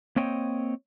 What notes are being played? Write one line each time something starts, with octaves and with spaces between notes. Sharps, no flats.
A#3 C4 C#5 D#5 G5